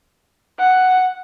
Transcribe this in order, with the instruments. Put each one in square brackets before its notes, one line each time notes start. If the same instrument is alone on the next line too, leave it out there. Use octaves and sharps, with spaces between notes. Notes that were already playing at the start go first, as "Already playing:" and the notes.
[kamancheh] F#5